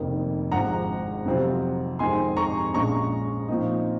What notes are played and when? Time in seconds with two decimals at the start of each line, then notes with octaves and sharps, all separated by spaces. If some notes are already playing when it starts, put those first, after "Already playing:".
Already playing: F1 F2 D#3 A#3
0.51 G#1 G#2 F3 F#5 A#5
1.25 F2 C3 F#3 C4 F4
1.99 F2 D#3 G#3 C4 G#5 C6
2.37 A#5 C#6
2.74 A#1 A#2 G#3 C#4 A#5 C#6
3.48 A#2 F3 C4 D#4